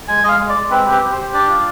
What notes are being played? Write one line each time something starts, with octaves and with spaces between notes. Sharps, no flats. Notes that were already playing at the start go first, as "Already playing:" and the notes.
G#3 G#5
G#3 D#5 F5
G#3
D5
G#3
C4 B4
G4
B4
G4
C5
G4
D4 D5
F4